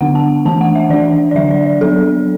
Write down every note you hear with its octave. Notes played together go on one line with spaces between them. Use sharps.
D3 B3 D4 F#5
A5
E3 A3 D4 A5
F#5
E5
E3 D4 D5
D5
D3 F#3 D4 E5
D5
D5
F#3 B3 D4 A4